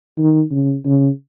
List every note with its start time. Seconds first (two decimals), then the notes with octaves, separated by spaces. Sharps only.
0.18 D#3
0.51 C#3
0.86 C#3